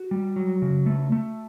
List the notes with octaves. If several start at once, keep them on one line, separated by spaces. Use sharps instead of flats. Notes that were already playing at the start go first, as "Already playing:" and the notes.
Already playing: F#4
G3
F#3
C#3
A3
A3